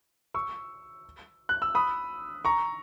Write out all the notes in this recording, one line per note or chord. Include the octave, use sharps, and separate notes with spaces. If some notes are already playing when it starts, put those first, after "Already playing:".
C#6 E6
F#6
E6
B5 D#6
A#5 C#6